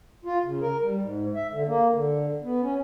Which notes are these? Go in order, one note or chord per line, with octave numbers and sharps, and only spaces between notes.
F4
C#3
A#4
G3
G#2
E5
D3
A#3
D3
B3
C#4